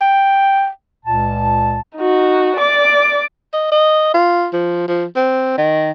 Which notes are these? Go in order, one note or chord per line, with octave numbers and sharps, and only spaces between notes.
G5
C#2 A#2 A5
D#4 F#4
D5 D6
D#5
D#5
F4
F3
F3
C4
D#3